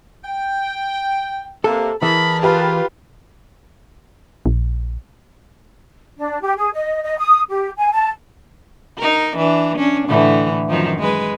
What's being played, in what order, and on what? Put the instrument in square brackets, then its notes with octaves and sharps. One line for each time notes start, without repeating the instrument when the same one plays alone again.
[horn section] G5
[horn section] C3 A#3 [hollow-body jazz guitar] A4
[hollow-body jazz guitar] E3 [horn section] G#4 A#4 A5 [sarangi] B5
[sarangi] F4 [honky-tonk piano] G4 B4
[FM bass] A#1
[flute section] D4
G4
G#4
D#5
D#5
D#6
G4
G#5
A5
[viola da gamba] D#4 A#4
E3 D4
C#4 D4
A2 D3 E3
F#2 D#3 F3
G#3 B4